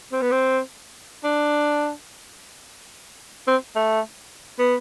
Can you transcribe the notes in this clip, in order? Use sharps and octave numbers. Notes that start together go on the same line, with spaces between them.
C4
B3
C4
D4
C4
A3
B3